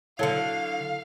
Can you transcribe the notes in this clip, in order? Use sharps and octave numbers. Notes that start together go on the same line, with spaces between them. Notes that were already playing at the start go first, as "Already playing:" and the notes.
D3 F#3 E4 A4 C#5 F5